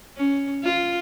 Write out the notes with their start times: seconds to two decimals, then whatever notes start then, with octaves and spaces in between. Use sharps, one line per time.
0.17 C#4
0.64 F4